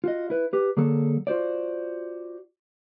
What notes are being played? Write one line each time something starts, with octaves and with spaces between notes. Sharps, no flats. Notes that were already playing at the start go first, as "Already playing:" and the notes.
F4 F#4 D#5
E4 B4
G4 B4
D3 F#3 A#3 G#4 A4
F4 F#4 C5 D5